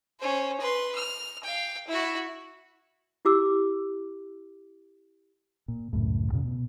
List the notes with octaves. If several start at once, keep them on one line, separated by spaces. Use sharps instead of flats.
C#4 C5
B4 C6
F6
F5 G5
E4 F#4
E4 G4 D6 E6
A#2
C#2 F#2 A2
F2 A#2 C#3
B2